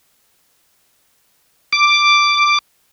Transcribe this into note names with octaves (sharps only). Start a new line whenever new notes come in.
D6